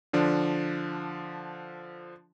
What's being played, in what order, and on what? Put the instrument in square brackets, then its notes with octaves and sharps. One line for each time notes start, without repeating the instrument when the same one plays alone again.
[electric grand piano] D3 F3 D4